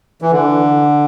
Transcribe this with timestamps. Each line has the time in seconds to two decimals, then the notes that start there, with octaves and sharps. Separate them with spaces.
0.22 E3
0.31 D3